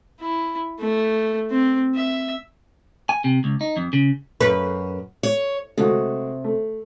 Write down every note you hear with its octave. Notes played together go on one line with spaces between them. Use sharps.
E4
A3
C4
E5
G#5
C3
C#2
D#4
F2
C#3
F#2 B4
C#5
C3 G#3 A3 F#4
A3